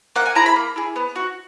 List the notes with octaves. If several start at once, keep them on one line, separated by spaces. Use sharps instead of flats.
A#3 F#5
G#5
E4 G#4 A#5
B5
A#3
E4 G#4
B3
F#4